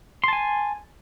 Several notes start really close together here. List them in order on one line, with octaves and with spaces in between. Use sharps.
C6 A5 G#5